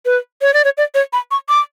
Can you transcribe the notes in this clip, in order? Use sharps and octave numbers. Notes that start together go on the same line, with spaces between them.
B4
C#5
D5
C#5
D5
C#5
B5
C#6
D6